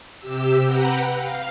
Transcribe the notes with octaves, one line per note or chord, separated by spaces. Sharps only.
C3 G4 E6
B4 F#5 G5 A#5
F5